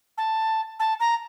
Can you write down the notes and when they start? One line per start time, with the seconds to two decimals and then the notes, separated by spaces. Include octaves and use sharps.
0.18 A5
0.79 A5
1.00 A#5